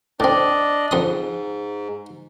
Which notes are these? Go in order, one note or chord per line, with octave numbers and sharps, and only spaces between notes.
A2 C4 D4 D5 D#5
F2 G#2 C6 D#6